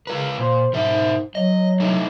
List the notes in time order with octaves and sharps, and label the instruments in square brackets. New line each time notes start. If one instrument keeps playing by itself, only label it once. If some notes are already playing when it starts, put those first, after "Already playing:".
[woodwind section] C#3 A#4 [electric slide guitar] F4 B4
[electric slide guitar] A#2 [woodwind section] C5
[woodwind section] G#2 [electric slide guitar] B2 A#4 E5
[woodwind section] F#3 [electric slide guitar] D#5
[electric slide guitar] A3 D#4 E4